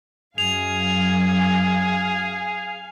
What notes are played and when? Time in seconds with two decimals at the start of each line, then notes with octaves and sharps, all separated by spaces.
0.38 F#2 G#4 F5 G#5 F7